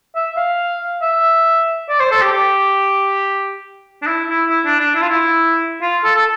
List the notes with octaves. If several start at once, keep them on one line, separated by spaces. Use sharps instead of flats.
E5
F5
E5
D5
C5
A4
G4
G4
D4
E4
E4
E4
D4
D4
E4
F4
E4
F4
A4
A4